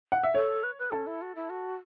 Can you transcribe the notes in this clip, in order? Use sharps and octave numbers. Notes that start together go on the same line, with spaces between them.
F#5
E5
A4 C#5
B4
B4
C#4 A4
E4
F#4
E4
F#4